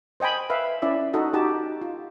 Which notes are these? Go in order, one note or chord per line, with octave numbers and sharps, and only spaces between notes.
C5 D#5 G5 G#5 B5
B4 E5 F5 B5
C#4 E4 D5 E5
D#4 F#4 A4 D#5
D#4 F#4 G4 A5
F4